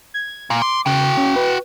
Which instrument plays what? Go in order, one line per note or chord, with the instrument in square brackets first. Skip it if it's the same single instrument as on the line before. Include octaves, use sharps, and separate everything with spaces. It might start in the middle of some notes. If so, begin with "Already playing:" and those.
[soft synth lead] G#6
[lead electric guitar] A#2
[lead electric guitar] C6 [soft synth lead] D6
[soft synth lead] C#3 [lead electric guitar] F#4 G5
[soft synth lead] C#4
B4